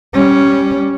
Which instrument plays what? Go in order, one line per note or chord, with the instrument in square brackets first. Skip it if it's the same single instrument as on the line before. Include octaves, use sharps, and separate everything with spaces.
[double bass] G3 C#4